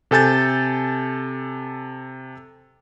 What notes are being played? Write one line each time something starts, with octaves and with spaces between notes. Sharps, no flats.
C3 A4 G#5 G6 A6